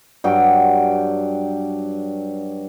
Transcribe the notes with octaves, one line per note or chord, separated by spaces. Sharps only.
G2 F#3 G5